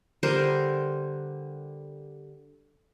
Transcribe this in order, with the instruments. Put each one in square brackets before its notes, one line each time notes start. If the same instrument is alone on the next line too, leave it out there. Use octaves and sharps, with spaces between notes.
[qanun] D3 G3 A#4 C5